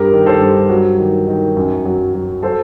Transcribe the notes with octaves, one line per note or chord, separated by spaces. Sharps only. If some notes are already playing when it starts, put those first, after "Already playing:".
Already playing: G2 G4 A#4
D#3
A4 C5
G2
F#3
D#3
D#3
F#2
F#3
F#3
F#3 A4 C5